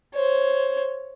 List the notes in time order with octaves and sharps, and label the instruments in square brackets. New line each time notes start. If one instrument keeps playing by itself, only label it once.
[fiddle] C5 C#5